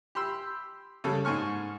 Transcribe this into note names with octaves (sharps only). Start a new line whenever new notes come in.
G4 B5 C6 E6
C#3 G3 A4
G#2 G#5 C#6 F6